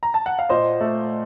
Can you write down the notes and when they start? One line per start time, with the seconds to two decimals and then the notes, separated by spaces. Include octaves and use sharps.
0.03 A#5
0.14 A5
0.26 F#5
0.39 F5
0.49 A#2 C5 D#5
0.81 A3